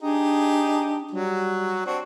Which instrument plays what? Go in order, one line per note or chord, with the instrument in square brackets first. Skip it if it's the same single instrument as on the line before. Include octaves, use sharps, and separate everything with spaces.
[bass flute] D4 [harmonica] D#4 G4 G#4
[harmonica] F#3 F#4 [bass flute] G3
[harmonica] C4 D4 F#4